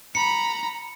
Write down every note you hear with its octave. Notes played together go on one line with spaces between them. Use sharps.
A#5 B5 C#7